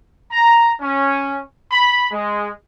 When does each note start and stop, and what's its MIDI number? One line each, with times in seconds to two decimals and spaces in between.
0.31 0.71 82
0.81 1.39 61
1.71 2.06 83
2.12 2.48 56